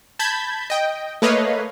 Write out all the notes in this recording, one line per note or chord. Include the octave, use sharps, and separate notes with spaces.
A5 B5 G6 G#6 B6
D#5 G5
A3 A#3 B4 C#5 D#5 F5